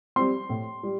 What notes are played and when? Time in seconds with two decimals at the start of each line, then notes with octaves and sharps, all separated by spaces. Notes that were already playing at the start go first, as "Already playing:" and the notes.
0.16 G3 C4 C6
0.49 A2
0.83 G3